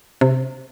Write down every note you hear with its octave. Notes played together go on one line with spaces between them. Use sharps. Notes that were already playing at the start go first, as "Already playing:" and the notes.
C3